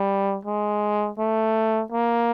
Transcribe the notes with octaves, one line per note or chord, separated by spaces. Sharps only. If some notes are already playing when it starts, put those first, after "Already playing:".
Already playing: G3
G#3
A3
A#3